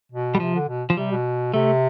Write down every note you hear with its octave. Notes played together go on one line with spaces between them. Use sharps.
B2
G3
C3 F3
D3
B2
F3
C3 G3
B2
C3 A3